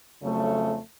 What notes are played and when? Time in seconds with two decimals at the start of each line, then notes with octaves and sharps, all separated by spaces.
0.22 F2 C#3 F#3 A3